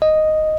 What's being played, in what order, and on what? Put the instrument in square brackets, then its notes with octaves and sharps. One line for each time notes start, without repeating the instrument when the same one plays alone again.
[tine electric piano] D#5